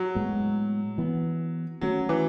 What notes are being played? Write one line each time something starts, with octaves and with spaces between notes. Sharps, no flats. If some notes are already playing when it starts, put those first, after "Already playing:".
Already playing: F#3
A2 G#3 B3
E3 B3
D#3 F#3 A3 C#4
E3